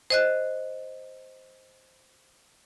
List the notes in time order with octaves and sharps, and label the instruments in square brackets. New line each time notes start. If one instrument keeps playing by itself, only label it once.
[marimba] C5 D#5 F#6